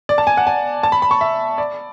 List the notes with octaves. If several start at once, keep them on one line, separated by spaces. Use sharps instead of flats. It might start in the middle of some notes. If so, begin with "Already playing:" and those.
D5
A5
G#5
F#5
G#5
A5
B5
B5
C#6
E5
D5